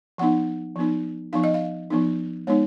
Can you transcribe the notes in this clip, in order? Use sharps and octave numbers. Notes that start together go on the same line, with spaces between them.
F3 B3 D#4 F#5
F3 B3 D#4
F3 B3 D#4 F5
D#5
F5
F3 B3 D#4
G#3 B3 D#4 C#5